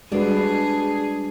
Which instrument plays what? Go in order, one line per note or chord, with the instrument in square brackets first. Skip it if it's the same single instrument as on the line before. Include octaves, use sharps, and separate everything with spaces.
[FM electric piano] G3 [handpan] G#3 F#4 B4 [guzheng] D4 [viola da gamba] G#4